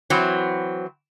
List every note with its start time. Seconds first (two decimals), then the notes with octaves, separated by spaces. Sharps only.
0.10 E3 F#3 C4